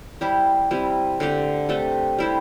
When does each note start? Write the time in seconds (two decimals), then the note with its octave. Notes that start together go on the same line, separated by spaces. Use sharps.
0.21 G3 E4 G4 C5
0.71 C3 G3 C4 E4
1.20 D3 A3 C4 G4
1.69 C3 A3 D4 A4
2.18 G3 E4 G4 C5